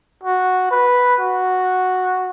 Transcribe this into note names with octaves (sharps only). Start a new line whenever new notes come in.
F#4
B4
F#4